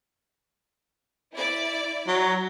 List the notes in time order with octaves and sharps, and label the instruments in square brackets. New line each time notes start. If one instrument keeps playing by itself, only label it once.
[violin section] E4 D5
[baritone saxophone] F#3